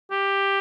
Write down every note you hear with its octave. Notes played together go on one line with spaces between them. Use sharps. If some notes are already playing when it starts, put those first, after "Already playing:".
G4